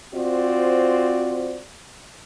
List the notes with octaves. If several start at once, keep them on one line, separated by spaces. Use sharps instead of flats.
C4 F4 F#4 C5 D5